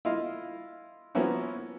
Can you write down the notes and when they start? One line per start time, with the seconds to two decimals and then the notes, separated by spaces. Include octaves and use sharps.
0.05 E4 F4 D#5 F5
1.15 F3 A#3 B3 C#4 E4 F#4